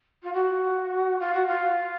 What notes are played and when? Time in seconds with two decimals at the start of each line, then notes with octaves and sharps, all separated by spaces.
0.23 F4
0.33 F#4
1.19 F4
1.33 F#4
1.47 F4